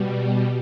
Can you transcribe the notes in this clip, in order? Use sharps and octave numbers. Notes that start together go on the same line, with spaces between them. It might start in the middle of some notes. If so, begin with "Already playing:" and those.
Already playing: B2 G3